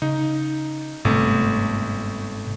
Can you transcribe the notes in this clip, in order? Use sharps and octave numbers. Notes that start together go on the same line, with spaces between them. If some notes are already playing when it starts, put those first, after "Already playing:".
C#3 D#4
G1 G#2 C3 A3 C4